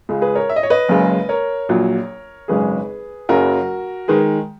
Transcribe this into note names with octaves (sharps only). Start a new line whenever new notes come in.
C#2 C#3 G#3
G#4 B4
A#4 C#5
E5
D#5
C#5
B4 D#5
F#1 F#2 C#3 G#3
A#4 C#5
A#1 A#2 F#3
G#1 F#2 C#3 G#3 G#4 B4
F#1 F#2 C#3 F#3 F#4 A#4
D#3 G#3 G#4 B4